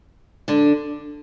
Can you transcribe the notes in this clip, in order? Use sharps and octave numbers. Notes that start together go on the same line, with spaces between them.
D3 D4